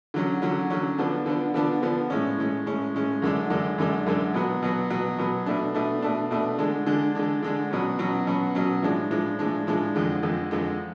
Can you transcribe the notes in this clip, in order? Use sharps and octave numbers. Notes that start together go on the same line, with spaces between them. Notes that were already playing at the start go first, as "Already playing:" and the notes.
D3 F#3 C#4
D3 F#3 C#4
D3 F#3 C#4
D3 F3 B3 D4
D3 F3 B3 D4
D3 F3 B3 D4
D3 F3 B3 D4
A2 G#3 C#4
A2 G#3 C#4
A2 G#3 C#4
A2 G#3 C#4
F#2 D3 G#3 D4
F#2 D3 G#3 D4
F#2 D3 G#3 D4
F#2 D3 G#3 D4
B2 F#3 B3
B2 F#3 B3
B2 F#3 B3
B2 F#3 B3
B2 A3 D4
B2 A3 D4
B2 A3 D4
B2 A3 D4
D3 G#3 D4
D3 G#3 D4
D3 G#3 D4
D3 G#3 D4
B2 F#3 C#4
B2 F#3 C#4
B2 F#3 C#4
B2 F#3 C#4
A2 F3 G#3 D4
A2 F3 G#3 D4
A2 F3 G#3 D4
A2 F3 G#3 D4
F2 D3 G#3
F2 D3 G#3
F2 D3 G#3